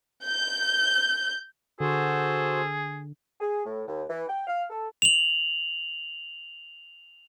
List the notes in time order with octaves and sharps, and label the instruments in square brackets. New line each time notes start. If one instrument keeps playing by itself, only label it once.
[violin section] G6
[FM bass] D3 [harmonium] F#4 C5 [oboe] G#4 [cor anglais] A4
[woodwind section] G#4
A2
D#2
E3
G5
F5
A4
[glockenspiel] F7 F#7